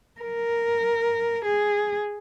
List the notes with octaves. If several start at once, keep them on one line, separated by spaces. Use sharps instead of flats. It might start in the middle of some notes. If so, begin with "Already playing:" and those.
A#4
G#4